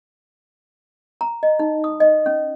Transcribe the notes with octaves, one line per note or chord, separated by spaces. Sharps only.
A#5
D#5
D#4
D#6
D#5
C#4